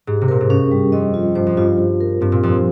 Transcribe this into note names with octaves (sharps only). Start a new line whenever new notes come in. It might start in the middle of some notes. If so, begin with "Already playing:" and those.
G#2 G4
C3
A#2 A#4
G#2
G2 C#4
G3
F2 D#5
F4
G2 C5
F2
G2 F4
F4
A#4
G2 C4
A#2
F2 G3